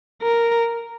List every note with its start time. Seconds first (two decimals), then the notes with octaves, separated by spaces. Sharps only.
0.22 A#4